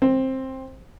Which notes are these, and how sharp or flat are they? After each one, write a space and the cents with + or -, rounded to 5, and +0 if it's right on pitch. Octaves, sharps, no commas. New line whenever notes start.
C4 +10